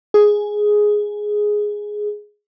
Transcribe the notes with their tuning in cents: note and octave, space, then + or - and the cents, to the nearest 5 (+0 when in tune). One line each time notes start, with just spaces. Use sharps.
G#4 +5